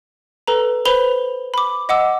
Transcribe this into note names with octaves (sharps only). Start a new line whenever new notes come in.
A4 B4 A#5
B4 C5 B5 F7 G7
B5 D6
D#5 F#5 D6 E6